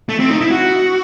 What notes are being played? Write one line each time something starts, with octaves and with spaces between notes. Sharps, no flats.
A3
C4
D#4
E4
F#4